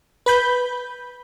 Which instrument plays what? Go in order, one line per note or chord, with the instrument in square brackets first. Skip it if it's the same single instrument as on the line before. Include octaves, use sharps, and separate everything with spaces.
[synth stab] B4 B5 G6